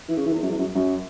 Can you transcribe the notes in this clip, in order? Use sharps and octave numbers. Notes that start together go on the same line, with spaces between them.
E3
C#3
E3
E2
F#2
E2
F#2
F#2